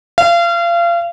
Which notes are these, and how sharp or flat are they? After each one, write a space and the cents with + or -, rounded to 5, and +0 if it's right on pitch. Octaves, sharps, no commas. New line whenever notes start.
F5 -30